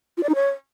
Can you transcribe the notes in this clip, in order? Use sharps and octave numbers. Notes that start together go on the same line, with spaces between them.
F4
D5
D#4
C#5